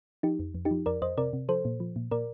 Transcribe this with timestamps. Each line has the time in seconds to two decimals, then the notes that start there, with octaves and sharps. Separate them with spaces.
0.23 F3 D#4 G4
0.39 F2
0.54 F2
0.65 D#4 G4
0.71 F3
0.86 F2 A#4 D5
1.02 F2 C5 D#5
1.18 C3 A#4 D5
1.33 C3
1.49 F3 A4 C5
1.65 A#2
1.80 F3
1.96 A#2
2.11 A#2 A#4 D5